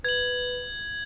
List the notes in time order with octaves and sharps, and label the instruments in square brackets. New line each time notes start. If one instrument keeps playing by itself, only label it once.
[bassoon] B4 [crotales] G#6 F#7